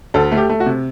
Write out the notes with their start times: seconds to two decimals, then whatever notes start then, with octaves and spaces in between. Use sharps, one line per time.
0.14 D2 A4
0.32 A3
0.37 G4
0.50 A3
0.60 F#4
0.66 C3